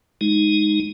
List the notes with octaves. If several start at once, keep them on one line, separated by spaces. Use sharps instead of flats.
G#3 D#4